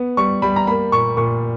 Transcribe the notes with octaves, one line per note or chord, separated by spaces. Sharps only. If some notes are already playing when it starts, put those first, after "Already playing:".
Already playing: B3
G3 C#6
G3 B5
A#5
A#3 B5
A#2 C#6
A#2 C#6